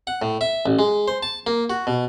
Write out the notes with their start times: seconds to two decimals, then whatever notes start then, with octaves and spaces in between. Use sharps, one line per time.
0.07 F#5
0.22 A2
0.41 E5
0.66 A1
0.79 G#3
1.08 C5
1.23 A5
1.47 A#3
1.70 F#4
1.87 B2